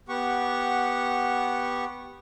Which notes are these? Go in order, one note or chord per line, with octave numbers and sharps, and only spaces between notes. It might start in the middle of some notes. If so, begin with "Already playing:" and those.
B3 G4 F#5 C#6